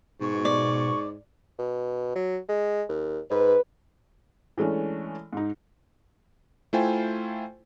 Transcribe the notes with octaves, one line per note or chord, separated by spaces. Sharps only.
G#2 B2 C#6
D5
B2
F#3
G#3
D#2
G#2 B4
E3 G#3 A3 C#4 D4
G#2 D#4
A3 E4 F4 C5 G5 G#5